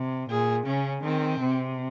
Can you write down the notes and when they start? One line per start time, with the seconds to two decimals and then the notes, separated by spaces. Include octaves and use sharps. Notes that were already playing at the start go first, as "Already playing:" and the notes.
Already playing: C3
0.30 A#2 G#4
0.66 C#3 C#4
1.04 D#3 C4
1.40 C3